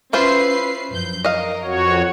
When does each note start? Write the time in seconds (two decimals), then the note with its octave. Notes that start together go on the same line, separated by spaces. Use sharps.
0.13 C#4 E4 F4 B4 C5 C7
0.90 F#2 F3 G6
1.24 A#4 D#5 F5
1.64 F2 F#4 C#5